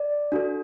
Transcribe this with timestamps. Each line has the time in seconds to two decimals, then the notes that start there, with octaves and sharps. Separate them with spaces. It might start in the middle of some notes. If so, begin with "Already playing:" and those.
Already playing: D5
0.32 D4 F#4 A4